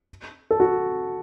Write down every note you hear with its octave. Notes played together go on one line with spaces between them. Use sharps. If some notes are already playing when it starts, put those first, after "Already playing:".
A4
F#4